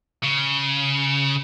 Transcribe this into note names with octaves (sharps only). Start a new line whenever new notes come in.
C#3